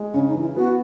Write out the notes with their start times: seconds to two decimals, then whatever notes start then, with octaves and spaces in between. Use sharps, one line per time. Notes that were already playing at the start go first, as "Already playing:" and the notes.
Already playing: G#3
0.14 C#3 C#4
0.28 D#4
0.35 E3
0.41 E4
0.56 B3 F#4